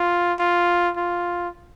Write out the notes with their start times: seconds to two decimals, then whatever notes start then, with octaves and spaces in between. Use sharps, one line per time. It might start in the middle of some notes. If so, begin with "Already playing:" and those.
Already playing: F4
0.39 F4
0.97 F4